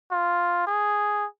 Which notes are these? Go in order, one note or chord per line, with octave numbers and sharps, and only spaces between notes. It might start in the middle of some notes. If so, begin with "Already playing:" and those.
F4
G#4